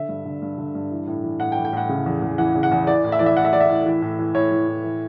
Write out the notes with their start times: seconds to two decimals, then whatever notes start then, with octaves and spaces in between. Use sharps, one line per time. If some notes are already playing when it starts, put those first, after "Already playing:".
Already playing: D3 E5
0.09 G2
0.25 D3
0.42 G2
0.58 D3
0.75 G2
0.91 E3
1.07 A2
1.24 E3
1.40 A2 F#5
1.52 G5
1.57 E3
1.65 G5
1.73 A2 F#5
1.89 C#3
2.06 E2
2.22 E2
2.38 E3 F#5
2.55 C#3
2.63 F#5
2.71 E2
2.87 E3 D5
3.04 A2
3.12 E5
3.19 E3 D5
3.26 E5
3.37 A2 F#5
3.45 E5
3.53 E3 D5
3.60 E5
3.69 A2
3.85 E3
4.02 A2
4.19 E3
4.35 A2 C#5
4.51 E3
4.68 A2
4.84 E3